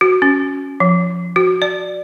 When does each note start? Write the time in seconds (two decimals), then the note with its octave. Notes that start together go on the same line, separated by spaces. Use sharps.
0.01 F#4
0.22 C#4
0.80 F3
1.36 F#4
1.62 D5